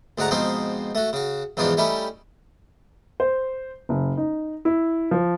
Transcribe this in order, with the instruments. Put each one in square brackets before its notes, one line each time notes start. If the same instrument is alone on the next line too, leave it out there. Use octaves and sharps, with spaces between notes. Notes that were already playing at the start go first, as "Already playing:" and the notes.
[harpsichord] D2 G#2 D4 F#5 A#5
G#2 B2 F3 C4 D#4
A3 F#4
C#3 F#4
E2 G#2 B2 F3 D4 D#4
G3 A3 C#4 D#4 E4 G4
[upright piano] C5
F#1
D#4
E4
F3